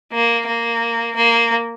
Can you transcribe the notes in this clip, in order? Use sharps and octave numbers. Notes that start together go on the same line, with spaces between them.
A#3
A#3
A#3